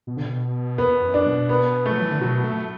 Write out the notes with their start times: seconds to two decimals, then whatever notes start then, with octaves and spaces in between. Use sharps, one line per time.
0.07 B2
0.17 D3
0.25 B2
0.78 E2 B3
1.02 F#2
1.14 D4
1.26 B2
1.49 B3
1.86 A3
1.92 F#3
2.01 E3
2.11 D3
2.21 B2 F#3
2.44 A3